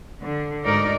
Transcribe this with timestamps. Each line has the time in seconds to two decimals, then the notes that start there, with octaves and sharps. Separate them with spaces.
0.22 D3
0.65 D2 G#2 D#4 A#4 D5